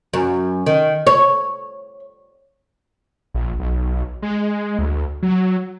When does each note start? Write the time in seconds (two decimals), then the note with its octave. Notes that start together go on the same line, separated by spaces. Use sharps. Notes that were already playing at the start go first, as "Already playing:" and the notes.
0.13 F#2
0.66 D#3
1.07 C#5
3.34 A#1
3.59 B1
4.22 G#3
4.79 D2
5.23 F#3